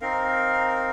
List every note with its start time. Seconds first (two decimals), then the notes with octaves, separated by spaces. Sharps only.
0.01 C4 D#4 A#4 F5